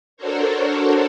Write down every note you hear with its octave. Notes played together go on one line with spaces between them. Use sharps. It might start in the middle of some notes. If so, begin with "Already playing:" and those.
D4 F#4 A4 A#4 C5 C#5